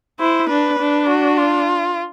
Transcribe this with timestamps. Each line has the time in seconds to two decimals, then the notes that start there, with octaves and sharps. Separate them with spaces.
0.19 E4 C5
0.49 D4 B4
0.79 D4
1.08 F#4
1.38 F4